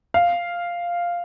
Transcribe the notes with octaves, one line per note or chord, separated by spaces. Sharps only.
F5